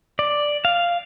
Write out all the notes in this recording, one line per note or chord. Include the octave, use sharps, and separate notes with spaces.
D5
F5